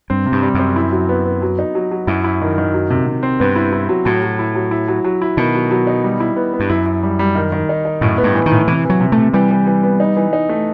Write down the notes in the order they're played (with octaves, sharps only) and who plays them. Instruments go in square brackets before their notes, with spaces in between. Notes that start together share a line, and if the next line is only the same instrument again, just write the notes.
[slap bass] G2 [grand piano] C4
[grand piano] C3
[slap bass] G2
[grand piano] G3
[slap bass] F#2 [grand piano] C4
[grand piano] E4
F#3
B3
B3
F#3
D#4
F#3
F#3
[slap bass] F#2 [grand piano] E4
[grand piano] E4
D#3
D#3
F#3
C3
C3
C4
[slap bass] G2 [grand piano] B3
[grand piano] E4
E4
F#3
[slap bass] A2 [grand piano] F#3
[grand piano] F#3
E4
F#3
E4
F#3
F#3
E4
[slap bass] B2 [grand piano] D#3
[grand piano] F#3
F#3
D#4
G3
E4
B3
B3
[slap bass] G2
[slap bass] F#2 [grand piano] E4
[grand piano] E4
G3
G3
D#3
D#3
D#4
D#4
[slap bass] F#2 [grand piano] A2
[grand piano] B3
[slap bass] G2
[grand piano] E3
[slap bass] D#3
[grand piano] A2
[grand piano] C3 [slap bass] E3
[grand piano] E3
[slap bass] F#3
[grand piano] C3
[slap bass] A3
[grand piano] C3
[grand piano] E3 [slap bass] G3
[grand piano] E3
E3
B3
D#4
E3
D#4
A3